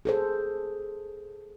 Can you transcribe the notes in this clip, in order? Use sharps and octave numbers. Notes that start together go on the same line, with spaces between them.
G#4 A4 C5